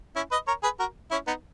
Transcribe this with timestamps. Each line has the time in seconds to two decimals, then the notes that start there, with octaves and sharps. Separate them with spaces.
0.16 C#4 E4
0.31 B4 D#5
0.47 A#4 C#5
0.63 G#4 B4
0.80 F#4 A#4
1.11 C#4 E4
1.27 B3 D#4